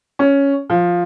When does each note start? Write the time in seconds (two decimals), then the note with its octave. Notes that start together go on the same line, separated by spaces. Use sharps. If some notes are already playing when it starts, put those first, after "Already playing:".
0.19 C#4
0.70 F3